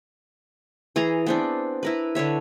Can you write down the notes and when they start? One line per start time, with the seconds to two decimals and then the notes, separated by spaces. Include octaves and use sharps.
0.96 E3 G#4 G#5 A#5
1.26 B3 C4 D4
1.83 E4 A#4 B4
2.15 D3 B4 C#5 E5